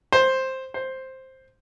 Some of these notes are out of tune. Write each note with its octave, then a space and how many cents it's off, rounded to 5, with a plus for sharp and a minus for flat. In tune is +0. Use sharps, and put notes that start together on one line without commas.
C5 +5
C5 +5